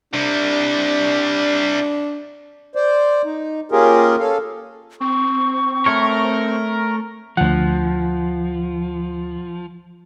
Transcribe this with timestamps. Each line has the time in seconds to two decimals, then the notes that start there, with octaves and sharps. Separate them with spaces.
0.13 C3 G3 D4
2.75 C5 D5
3.25 D#4
3.72 A#3 C#4 F4 G4 G#4 A#4
4.19 C#4 A4 F5
5.01 C4 C#6
5.86 A3 A#4 C#5
7.37 D2 F3 F#5